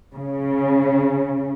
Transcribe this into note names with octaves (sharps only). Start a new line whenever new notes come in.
C#3